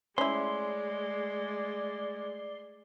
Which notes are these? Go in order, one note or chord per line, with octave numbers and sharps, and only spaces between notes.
G#3 A3 C#4 E4 D5 C6